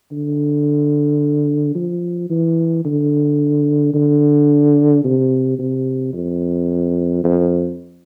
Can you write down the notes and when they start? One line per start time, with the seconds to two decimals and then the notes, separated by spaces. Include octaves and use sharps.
0.11 D3
1.75 F3
2.29 E3
2.85 D3
3.94 D3
5.04 C3
5.59 C3
6.13 F2
7.24 F2